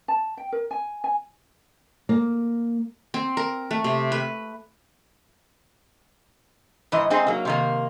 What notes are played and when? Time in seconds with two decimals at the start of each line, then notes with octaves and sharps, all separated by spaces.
0.08 A5
0.37 G5
0.52 A#4
0.71 G#5
1.04 G#5
2.09 A#3
3.14 C4
3.37 A#4
3.71 A3
3.84 C3
4.12 B4
6.92 G#2 E3 D#5
7.10 G#3 C4 D#4 G#4
7.27 F#3 A#3
7.45 C3 D#3 A#3